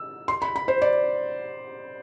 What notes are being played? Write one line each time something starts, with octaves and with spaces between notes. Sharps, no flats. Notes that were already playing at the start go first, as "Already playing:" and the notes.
Already playing: E6
C6
B5
B5
C5
D5